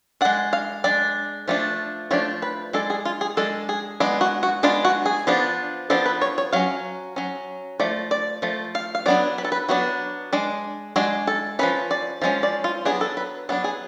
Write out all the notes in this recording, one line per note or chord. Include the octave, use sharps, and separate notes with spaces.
G#3 D4 F#5
F5
G#3 D4 D5
F3 A3 D4
F3 A3 D4 C#5
B4
G#3 D4 A4
G#4
F4
G#4
G#3 D4 A4
G#4
G#3 B3 D4 F#4
F#4
F#4
G#3 B3 D4 F4
F#4
G#4
F3 B3 D4
F3 B3 D4 A4
B4
C#5
C#5
F#3 C#4 F5
F#3 C#4
F3 A3 D5
D5
F3 A3
F5
F5
F#3 B3 D4 D5
B4
A4
B4
F#3 B3 D4 F#4
G#3 D4
G#3 D4 F#4
A4
F3 G#3 C#4 B4
D5
F3 G#3 C#4
D5
F4
F#3 B3 D4 G#4
A4
B4
F#3 B3 D4 A4
G#4